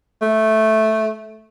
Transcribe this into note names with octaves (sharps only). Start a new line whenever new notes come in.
A3